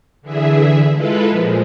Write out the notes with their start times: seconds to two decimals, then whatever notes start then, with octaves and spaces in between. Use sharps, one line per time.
0.22 D3 E3 G#4 E5
0.93 G#3 E4 F4 A4 B4
1.29 A#2 F3 G#3